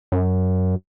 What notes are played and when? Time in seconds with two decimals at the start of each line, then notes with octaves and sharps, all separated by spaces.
0.12 F#2